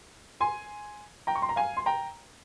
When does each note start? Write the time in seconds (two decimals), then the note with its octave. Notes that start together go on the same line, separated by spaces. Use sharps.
0.41 G#5 C6
1.27 G5 A#5
1.35 C#6
1.42 C6
1.49 A#5
1.56 F5 G#5
1.77 C6
1.86 G5 A#5